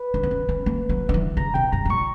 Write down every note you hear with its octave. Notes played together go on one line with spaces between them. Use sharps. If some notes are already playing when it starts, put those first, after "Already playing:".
Already playing: B4
D4
B3
C#4
C#4
A#3
F#3
D3
E3
C#3 A#5
B2 G5
G2 A#5
G2
A#2 C#6